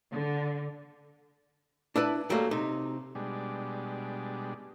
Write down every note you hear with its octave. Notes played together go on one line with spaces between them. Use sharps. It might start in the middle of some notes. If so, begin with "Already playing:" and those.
D3
D4 E4 B4 A5
G2 F#3 G3 A3 A#3
C3 D#4
B2 G3 G#3 D4